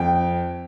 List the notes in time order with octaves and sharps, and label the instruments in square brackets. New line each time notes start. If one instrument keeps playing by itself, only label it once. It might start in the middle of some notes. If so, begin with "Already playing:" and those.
Already playing: [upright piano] F2 G5